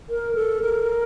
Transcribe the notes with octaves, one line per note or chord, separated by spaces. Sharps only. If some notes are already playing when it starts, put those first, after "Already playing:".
A#4
A4
A#4